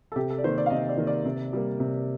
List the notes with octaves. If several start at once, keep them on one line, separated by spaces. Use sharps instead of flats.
A4
C3 G4
A4
D5
D#3 A#3 C5
D5
F5
C3 D#5
D5
D#3 A#3
D5
C3
G3 A#3
C3